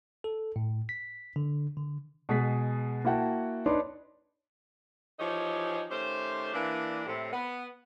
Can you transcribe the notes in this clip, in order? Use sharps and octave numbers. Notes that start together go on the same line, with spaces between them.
A4
A2
B6
D3
D3
B2 G#3 G#4 B6
A#3 E4 F#4 F#5 G5 A5
D4 D#4 B4 C#5 D5 C6
E3 F3 D#4 G4 G#4 C#5
D#3 A3 C#4 G4 C5
E3 A#3 D4
A2 C3
B3